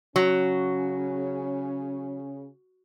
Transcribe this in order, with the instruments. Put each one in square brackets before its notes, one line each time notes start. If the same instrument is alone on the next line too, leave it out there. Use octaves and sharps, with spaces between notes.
[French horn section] C#3 C#4 [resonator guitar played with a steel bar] F#3